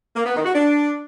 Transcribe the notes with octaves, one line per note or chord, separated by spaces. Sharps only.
A#3
B3
D#3
F#4
D4